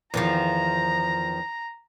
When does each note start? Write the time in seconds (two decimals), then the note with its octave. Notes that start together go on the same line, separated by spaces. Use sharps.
0.14 E2 D#3 F3 A#5